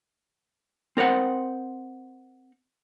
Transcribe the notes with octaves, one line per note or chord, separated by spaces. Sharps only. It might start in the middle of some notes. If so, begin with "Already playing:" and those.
C4 A#4 C5 F#5